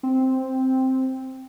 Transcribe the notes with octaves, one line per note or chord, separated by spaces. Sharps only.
C4